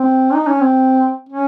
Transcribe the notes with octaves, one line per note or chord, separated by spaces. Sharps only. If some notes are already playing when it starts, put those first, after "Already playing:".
Already playing: C4
D#4
C#4
C4
C#4